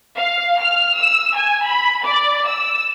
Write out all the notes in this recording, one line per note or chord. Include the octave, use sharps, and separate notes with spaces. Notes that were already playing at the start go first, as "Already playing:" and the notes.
F5
F6
E6
G#5
B5
D5
E6